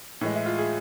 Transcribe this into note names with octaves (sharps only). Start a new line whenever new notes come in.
A2 E3 G#3
E4
F4
G#4